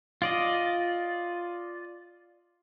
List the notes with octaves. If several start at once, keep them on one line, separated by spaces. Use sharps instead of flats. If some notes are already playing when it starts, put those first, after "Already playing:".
F4 D5 D#5